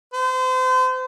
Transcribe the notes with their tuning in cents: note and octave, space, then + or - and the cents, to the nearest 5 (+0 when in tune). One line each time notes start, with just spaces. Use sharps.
C5 -35